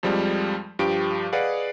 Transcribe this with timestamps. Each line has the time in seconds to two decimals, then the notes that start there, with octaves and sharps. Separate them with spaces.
0.03 F2 F3 G3 G#3
0.79 G2 F3 G4 D6 D7
1.32 G#4 B4 D5 D#5 F5 F#5